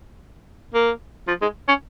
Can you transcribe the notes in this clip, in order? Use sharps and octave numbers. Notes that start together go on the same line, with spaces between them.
A#3
F3
G#3
C#4